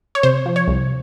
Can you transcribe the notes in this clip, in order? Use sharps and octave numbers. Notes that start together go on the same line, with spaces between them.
C#5
C3 C5
F3
C#5
C2